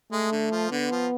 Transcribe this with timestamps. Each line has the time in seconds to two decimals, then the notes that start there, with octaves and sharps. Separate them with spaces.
0.12 G#3 A3
0.32 D3
0.52 F3
0.71 D3 B3
0.91 F3